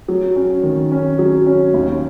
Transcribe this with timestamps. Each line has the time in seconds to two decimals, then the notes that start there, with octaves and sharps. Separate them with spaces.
0.08 F#3
0.36 C#4
0.63 D#3
0.92 C#4
1.19 F#3
1.47 C#4
1.74 D#2